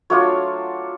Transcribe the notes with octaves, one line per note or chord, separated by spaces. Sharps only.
F#3 A3 D4 F4 C#5